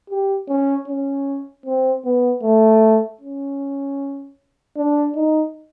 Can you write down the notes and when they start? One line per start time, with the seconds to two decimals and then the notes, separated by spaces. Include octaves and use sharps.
0.10 G4
0.48 C#4
0.88 C#4
1.65 C4
2.05 B3
2.43 A3
3.21 C#4
4.77 D4
5.16 D#4